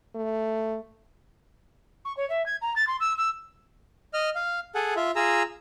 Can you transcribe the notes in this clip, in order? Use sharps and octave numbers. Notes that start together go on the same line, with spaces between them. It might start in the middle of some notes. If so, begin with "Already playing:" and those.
A3
C#6
C#5
E5
G#6
A#5
A6
C6
E6
E6
D#5 F6
F5
G#4 A4 F#5
F4 E5
F4 G#4 A#5 E6